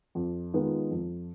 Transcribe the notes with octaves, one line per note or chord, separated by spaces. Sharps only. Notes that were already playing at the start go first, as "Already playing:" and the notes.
F2
D#3 G#3 B3 F4
F2